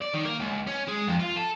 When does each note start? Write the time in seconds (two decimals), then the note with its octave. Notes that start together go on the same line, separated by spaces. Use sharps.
0.01 D5
0.14 D#3
0.25 A#3
0.40 C#2
0.67 C#4
0.88 G#3
1.07 F2
1.20 F4
1.37 A4